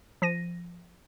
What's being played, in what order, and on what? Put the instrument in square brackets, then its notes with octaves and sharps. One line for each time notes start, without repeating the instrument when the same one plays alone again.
[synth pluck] F3 A#6 D#7